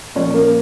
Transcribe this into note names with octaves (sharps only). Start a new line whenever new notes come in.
A#2 F3 C#4 C#5
A#3 A#4